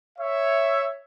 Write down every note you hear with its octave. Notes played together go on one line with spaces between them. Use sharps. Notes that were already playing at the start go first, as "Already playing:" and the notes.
C#5 E5